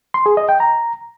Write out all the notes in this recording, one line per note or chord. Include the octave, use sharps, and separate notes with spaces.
C6
G#4
D#5
G5
A#5